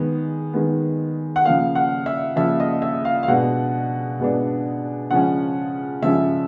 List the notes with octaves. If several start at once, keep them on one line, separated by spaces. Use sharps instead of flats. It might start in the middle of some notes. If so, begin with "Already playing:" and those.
Already playing: D#3 G#3 B3
D#3 G#3 B3
F#5
C#3 F3 A#3 F5
F#5
E5
C#3 F3 A#3 E5
D#5
E5
F5
F5
B2 G#3 B3 D4 F#5
B2 G#3 B3 D4
C#3 F3 G#3 C#4 F#5
C#3 F3 G#3 C#4 E5